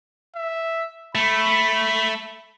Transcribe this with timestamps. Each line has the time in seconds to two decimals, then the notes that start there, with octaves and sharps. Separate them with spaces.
0.36 E5
1.15 A3 B5